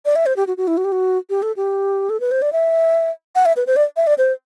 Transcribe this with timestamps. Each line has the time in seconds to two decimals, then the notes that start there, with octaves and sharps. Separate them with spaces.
0.05 D5
0.16 E5
0.26 C5
0.37 G4
0.47 F#4
0.57 F#4
0.67 E4
0.77 F#4
0.85 G4
0.92 F#4
1.30 G4
1.42 A4
1.57 G4
2.10 A4
2.20 B4
2.31 C5
2.42 D5
2.53 E5
3.35 F#5
3.46 E5
3.57 B4
3.67 C5
3.76 D5
3.97 E5
4.07 D5
4.18 C5